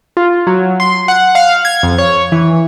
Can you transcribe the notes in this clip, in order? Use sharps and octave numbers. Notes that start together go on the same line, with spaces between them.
F4
F#3
C6
F#5
F5
G#6
F2
C#5
E3